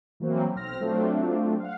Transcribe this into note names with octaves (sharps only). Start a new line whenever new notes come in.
E3 F#3 A#3 C4
B1 C4 F6 A#6
F#3 A3 C4 D4 F4
F5 F#5